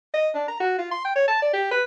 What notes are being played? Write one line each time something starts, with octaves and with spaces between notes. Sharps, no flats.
D#5
D4
A#5
F#4
F4
C6
G5
C#5
A5
D5
G4
B4